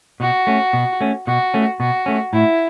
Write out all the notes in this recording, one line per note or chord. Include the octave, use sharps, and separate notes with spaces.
B2 F#4
A3 C#4
B2
A3 C#4
B2 F#4
A3 C#4
B2 F#4
A3 C#4
A2 E4